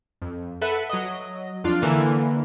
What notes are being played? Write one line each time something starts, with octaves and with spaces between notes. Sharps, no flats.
F2
A4 B4 E5 F#5
F#3 D#5
F2 D4 F4
D3 E3 A#3